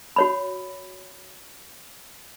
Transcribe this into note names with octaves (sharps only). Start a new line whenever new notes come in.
F#4 C#5 B5